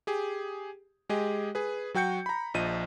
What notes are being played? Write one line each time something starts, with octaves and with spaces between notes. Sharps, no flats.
G4 G#4
G#3 G4 G#4 D#5
G#4 B4
F#3 F#4 G5 G6 C#7
A#5 B5
A#1 F3 D#5 D#7